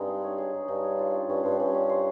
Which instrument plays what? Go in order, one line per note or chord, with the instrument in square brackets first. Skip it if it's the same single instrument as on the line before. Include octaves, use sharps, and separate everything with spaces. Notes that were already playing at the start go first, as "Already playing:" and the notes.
Already playing: [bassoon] G2 [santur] G#3 C4 D#4
[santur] G#4
C#5
G#4
D#4
[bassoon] G2 [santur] D#4
[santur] C#5
F4
C#4
[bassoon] G2 [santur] C#4
[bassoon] G2 [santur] C5
[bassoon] G2 [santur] C#4
[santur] C#4
C5